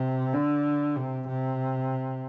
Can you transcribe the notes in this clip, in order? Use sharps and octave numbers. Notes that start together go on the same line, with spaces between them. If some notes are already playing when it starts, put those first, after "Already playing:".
Already playing: C3
D3
C3
C3